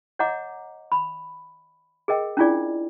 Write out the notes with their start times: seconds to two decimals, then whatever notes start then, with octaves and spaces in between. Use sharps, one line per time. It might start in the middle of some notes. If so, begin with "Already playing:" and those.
0.19 C#5 D#5 F#5 A#5 D6
0.92 B5
2.08 G#4 A#4 D#5 G5
2.37 C#4 D4 E4 F4 G#4 D5